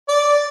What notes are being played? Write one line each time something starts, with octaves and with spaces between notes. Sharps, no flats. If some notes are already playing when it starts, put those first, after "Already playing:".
D5